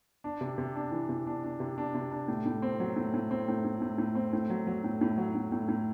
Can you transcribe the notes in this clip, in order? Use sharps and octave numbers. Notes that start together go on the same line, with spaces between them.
D4
C3
C3
D4
E3
C3
D4
D4
C3
D4
C3
D4
A2
A2
C4
F#3
A2
A2
C4
A2
A2
A2
A2
C4
A2
F#3
F#3
A2
A2
F#3
A2
A2
A2